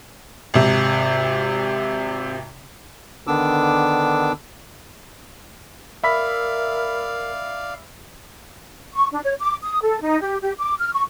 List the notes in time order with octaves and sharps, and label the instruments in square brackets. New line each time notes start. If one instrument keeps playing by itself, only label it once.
[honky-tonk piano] G#1 C3
[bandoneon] D3 D#3 B3 D4 D6 E6
[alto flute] A#4 [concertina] D5 F5 [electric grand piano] E5 B5 B6
[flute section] C#6
D4
C#5
D6
D#6
A4
D#4
G4
G4
D6
F6
C#6